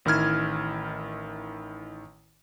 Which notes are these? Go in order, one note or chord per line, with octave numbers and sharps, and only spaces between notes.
A1 D#3 E4 F6 G#6